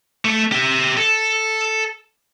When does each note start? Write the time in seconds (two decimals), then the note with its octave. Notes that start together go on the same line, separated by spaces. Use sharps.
0.25 A3 A4
0.52 G4 E5
0.97 A4